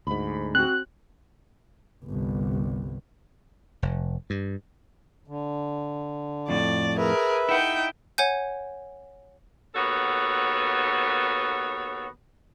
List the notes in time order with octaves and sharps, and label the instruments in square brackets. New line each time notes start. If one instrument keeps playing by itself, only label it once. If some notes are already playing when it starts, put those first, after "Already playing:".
[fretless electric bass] D2 G#2 [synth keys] B5
[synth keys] C4 F#4 [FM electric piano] F#6
[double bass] G1 C2
[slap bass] F1
G2
[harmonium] D3
[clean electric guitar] F2 A2 [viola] D5
[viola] G#4 A#4 [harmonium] B4 E5
[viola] D#4 G5 [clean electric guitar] E4 F#5
[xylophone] C#5 F#5 G#5 G6
[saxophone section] D#2 B3 F#4 A4 C#5